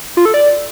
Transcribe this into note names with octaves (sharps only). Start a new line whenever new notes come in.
F4
A4
D5